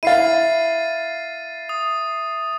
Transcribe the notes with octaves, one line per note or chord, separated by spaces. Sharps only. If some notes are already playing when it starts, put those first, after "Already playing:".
E4 F5 A6 C7 D#7
D#6